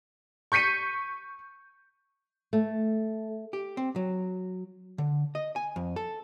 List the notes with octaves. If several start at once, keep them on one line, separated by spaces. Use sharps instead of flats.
C#6 G6 B6 C#7 D#7
A3
G4
C4
F#3
D3
D#5
G#5
F2
A4